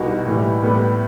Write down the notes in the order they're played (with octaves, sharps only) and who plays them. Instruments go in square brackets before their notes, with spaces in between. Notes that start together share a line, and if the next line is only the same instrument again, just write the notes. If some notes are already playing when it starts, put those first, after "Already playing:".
Already playing: [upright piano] C2 B2 G3 D#4 F#4
A2 E3 G3
A2 G3 B3